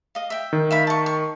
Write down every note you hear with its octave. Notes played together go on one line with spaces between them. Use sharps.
D#5 F5
E5 G5
D#3
E5 F5 B5
A5 C#6
C#6